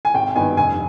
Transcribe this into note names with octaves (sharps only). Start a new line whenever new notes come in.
G#5
G#1 G5
G2 D#3 B3 D#4 G#5
F1 G#5